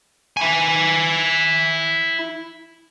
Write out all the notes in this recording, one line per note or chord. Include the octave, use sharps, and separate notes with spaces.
E4 G#5